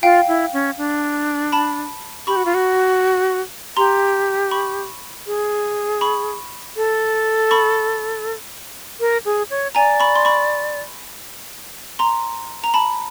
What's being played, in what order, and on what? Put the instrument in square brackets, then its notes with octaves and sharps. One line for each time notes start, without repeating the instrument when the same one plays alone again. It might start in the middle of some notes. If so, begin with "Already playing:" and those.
[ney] F4 [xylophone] F5 G5
[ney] E4
C#4
D4
[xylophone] A5 B5
[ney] G4 [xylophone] B5 C#6
[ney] F#4
F4
F#4
[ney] G4 [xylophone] A#5 C6
[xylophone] B5 C#6
[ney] G#4
[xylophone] B5 C#6
[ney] A4
[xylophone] B5 C#6
[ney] A#4
G#4
C#5
[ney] D5 [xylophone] G#5 A#5
[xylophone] B5 C#6
C6
B5 C#6
A#5 C6
A#5
A5 B5